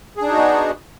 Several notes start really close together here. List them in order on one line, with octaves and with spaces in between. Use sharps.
G#4 D4 D#4 F#4 B3